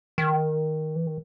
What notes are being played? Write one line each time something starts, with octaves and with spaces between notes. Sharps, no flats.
D#3
E3
D#3